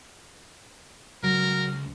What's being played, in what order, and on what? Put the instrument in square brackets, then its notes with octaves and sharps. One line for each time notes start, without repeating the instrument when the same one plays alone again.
[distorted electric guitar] C#2 [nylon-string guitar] F#3 [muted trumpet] A#4